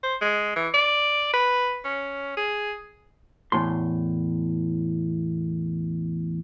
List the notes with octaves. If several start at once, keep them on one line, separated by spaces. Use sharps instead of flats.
C5
G#3
E3
D5
B4
C#4
G#4
E2 A2 C6